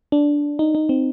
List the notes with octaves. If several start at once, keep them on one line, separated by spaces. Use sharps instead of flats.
D4
D#4
D#4
C4